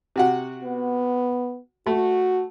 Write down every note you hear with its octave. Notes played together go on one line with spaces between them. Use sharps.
C3 F#4 F#5
B3
A3 F#4